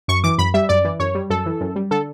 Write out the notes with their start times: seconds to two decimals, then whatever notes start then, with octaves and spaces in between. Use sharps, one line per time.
0.08 F#2 C#6
0.24 E3 D6
0.38 F#2 B5
0.54 G3 E5
0.69 F#2 D5
0.84 E3
1.00 F#2 C#5
1.15 G3
1.30 F#2 A4
1.46 E3
1.61 F#2
1.76 G3
1.91 D3 A4